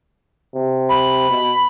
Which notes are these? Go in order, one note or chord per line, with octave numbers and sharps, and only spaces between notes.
C3
B5
B2